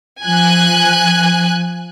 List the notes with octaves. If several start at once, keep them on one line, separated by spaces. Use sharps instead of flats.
F3 G#5 F#6